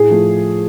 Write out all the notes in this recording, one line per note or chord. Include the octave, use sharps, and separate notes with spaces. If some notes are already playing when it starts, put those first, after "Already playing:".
Already playing: A2 G#4
F3 A3